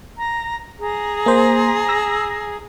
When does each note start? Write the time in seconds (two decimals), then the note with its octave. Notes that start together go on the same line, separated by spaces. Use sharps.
0.18 A#5
0.79 G#4 A#5
1.26 A#3 C5
1.89 E6 A#6